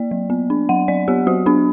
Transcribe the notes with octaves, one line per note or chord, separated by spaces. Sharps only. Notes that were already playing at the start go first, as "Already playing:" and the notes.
Already playing: A#3 D5
F#3
B3
D4
F#3 F#5
F#3 D5
B3 G4
F#3 F#4
B3 D4